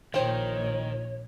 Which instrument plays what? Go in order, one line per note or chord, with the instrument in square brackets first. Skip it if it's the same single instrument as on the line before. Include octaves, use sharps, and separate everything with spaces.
[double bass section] A#1 A#2 [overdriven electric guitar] D#3 [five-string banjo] C5 G5 [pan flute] C#5